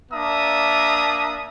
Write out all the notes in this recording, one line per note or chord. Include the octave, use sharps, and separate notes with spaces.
A#3 D4 E5 A5 A#5 D#6